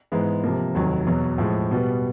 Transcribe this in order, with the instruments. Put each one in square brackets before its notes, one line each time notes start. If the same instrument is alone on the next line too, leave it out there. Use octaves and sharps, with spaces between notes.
[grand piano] G#2 E3 G#3 B3
C3 F3 A#3
F1 D#2 D#3 F#3
E2 B2 F#3
A2 F3 G#3
B2 G3 B3